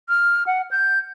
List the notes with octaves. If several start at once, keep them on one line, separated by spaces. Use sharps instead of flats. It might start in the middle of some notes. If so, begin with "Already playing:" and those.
F6
F#5
G6